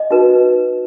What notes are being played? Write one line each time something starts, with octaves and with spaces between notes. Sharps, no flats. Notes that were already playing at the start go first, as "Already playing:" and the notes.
Already playing: D#5
D#4 F#4 B4